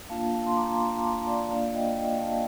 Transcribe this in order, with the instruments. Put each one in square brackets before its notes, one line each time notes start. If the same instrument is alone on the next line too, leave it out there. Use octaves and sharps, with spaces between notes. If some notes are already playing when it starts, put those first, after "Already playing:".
[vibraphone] A#3 D4 F4 F5 A5
F5 A5
C6
A#5 D6
A#5 D6
A5 C6
D5 F5
A#3 D4 F4 D5 F5
D#5 G5
D#5 G5
F5 A5